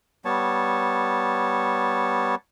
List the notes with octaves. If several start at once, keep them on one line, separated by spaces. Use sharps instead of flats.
G3 B3 C#5 A5